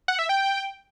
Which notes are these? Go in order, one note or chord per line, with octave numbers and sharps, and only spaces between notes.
F#5
E5
G5